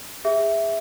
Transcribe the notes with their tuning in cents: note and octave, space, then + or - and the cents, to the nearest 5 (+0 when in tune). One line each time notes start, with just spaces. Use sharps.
G#4 -25 E5 +0